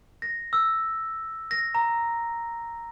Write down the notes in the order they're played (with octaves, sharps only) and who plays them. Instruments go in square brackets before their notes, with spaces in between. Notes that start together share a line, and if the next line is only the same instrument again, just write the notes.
[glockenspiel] A#6
E6
A#6
A#5